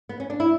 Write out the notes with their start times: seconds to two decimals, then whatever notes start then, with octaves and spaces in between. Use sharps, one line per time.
0.09 B3
0.20 C#4
0.30 D4
0.40 E4